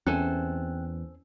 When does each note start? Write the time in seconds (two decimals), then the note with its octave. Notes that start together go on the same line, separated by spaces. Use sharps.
0.07 E2 C4 C#4 A4 C5 G5 G#5 F#6